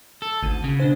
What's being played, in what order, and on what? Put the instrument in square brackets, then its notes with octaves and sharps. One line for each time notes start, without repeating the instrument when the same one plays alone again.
[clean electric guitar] A4
[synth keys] G#1 D#7 [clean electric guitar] D2
[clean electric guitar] C#3
[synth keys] B2 D4 C5